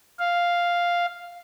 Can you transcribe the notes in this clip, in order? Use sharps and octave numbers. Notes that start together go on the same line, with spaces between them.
F5